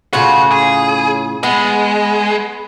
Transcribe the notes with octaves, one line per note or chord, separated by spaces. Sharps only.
A2 C#3 F4 F#4
G#4
G#3 B3